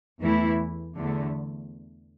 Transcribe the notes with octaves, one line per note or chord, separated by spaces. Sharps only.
E2 E3 A3 E4
E2 D3 A3